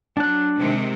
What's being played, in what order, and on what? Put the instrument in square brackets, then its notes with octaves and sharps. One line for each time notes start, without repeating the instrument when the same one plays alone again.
[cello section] F#3 [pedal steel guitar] D4 F#6
[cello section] C3 D#3 G#3